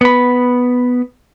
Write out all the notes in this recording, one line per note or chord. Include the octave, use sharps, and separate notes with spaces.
B3 B5